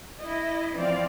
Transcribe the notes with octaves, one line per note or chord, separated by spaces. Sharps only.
E4 D#5
E3 F3 C4 D5 F5